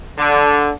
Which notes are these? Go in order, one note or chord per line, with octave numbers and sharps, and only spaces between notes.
D3